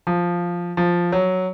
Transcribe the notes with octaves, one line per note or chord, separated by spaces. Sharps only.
F3
F3
F#3